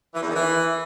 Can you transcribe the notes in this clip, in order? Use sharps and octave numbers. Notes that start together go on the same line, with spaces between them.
E3
E2
D#3
E3